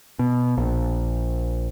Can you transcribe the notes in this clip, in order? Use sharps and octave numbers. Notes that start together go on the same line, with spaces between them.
B2
A#1